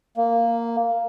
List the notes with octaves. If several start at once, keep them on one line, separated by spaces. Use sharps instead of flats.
A#3